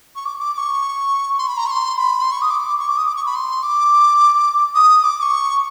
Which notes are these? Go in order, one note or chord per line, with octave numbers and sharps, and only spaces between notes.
C#6
D6
D6
D6
C#6
C6
B5
A#5
C#6
C6
C6
B5
C6
C#6
D#6
D6
C#6
D6
D#6
D6
C#6
B5
C6
D6
D#6
D6
D6
C#6